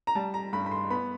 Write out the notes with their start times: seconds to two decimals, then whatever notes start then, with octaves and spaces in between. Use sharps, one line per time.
0.07 A#5
0.15 G3 A5
0.34 A#5
0.53 G2 B5
0.66 B5
0.71 C6
0.90 B3 B5